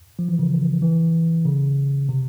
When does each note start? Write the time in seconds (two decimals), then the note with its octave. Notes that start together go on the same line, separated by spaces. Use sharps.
0.19 F3
0.29 E3
0.39 C#3
0.82 E3
1.45 C#3
2.09 C3